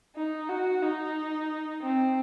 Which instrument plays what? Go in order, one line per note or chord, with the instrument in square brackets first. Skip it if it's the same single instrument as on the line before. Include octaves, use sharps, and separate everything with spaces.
[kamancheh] D#4
F#4
D#4
C4